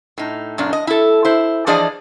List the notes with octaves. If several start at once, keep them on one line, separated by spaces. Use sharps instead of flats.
A2 D#4
F#2 A#2 D4
D#5
E4 A4
E4 C5
E3 F3 D4 G#4 D5 D#5